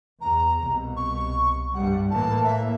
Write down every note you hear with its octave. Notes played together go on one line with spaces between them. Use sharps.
E2 A#5
C2 B2
C#6
G2 G3 F#5
A2 E3 A#3 A5
E5